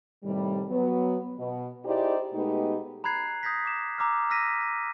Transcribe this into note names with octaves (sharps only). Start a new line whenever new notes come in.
A2 C3 D#3 G3
F#3 B3
B2
D#4 E4 G4 G#4 C5 D5
B2 G#3 A3 B3 D#4 G4
A#5 B5 F#6 G#6 C7
D#6 G6 G#6 A#6 B6
D6 E7
A#5 D6 E6 F6
E6 F6 A#6 B6 D#7